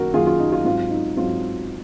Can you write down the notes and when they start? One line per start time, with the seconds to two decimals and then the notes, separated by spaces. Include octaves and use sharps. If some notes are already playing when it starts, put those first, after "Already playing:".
Already playing: F#2 D#3 A#3 F#4 A#4
0.14 F#2 D#3 A#3 F4 G#4
0.27 F4
0.40 D#4
0.52 F4
0.65 G#2 F#3 C4 F4
0.90 D#4
1.17 G#2 F#3 C4 F4